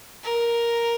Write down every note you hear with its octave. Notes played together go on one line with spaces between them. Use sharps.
A#4